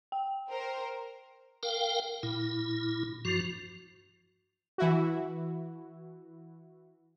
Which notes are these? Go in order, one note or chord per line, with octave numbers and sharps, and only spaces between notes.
G5
A#4 C5
A#4 F5 G5
A#2 E4
G2 F3 F#4
E3 E4 F#4